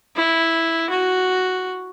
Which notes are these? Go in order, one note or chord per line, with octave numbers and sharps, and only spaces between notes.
E4
F#4